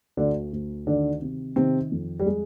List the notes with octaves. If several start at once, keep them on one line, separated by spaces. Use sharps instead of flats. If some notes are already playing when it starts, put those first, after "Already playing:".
D2 D3 D4
D2
D3 D#3 D4
C3
C3 D#3 C4
F2
G3
G#3